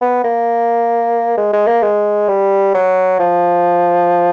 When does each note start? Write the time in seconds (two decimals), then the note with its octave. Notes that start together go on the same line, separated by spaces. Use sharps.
0.02 B3
0.24 A#3
1.37 G#3
1.53 G#3
1.67 A#3
1.83 G#3
2.29 G3
2.74 F#3
3.19 F3